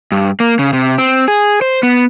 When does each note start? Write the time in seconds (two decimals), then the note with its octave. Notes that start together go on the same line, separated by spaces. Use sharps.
0.12 G2
0.40 A#3
0.59 C#3
0.73 C3
0.98 C4
1.28 G#4
1.62 C5
1.83 B3